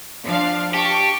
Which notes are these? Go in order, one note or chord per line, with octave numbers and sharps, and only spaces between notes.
F3 D4 F5
G4 A5 C#6